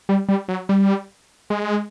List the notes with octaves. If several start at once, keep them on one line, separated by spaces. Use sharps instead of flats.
G3
G3
F#3
G3
G#3